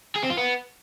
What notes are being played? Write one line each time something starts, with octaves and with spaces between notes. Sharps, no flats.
G#4
C4
F4
B3